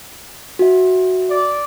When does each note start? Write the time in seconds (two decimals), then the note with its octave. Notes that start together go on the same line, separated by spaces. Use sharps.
0.59 F#4 E5
1.30 D5